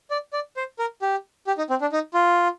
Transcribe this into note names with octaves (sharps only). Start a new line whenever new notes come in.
D5
D5
C5
A#4
G4
G4
D#4
C4
D4
D#4
F4